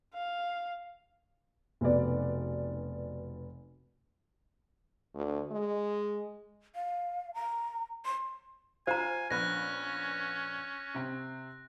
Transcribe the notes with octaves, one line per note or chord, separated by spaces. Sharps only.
F5
F1 B1 B3 D5
D2
G#3
F5
A#5
C6
F4 C5 F5 G#5 A#5
A#1 B3 C#4 B5 F#6 A#6
C3 C4